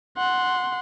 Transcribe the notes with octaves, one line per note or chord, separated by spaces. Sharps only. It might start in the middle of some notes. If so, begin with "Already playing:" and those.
F#5 C6